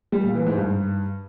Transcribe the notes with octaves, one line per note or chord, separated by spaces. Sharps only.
G3
A#2
E3
G#2
G2